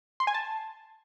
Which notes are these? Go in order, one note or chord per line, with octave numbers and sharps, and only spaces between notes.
C6
G#5
A5